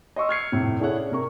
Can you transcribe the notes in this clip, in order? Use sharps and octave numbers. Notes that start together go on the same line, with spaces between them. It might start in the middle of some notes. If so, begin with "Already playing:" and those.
D#5 C6 C#6 E6
F6 G#6 C7 C#7
F2 A2 C3
D4 E4 G#4 A4 C#5 F#5
C#4 D5
C3 A#4 C#6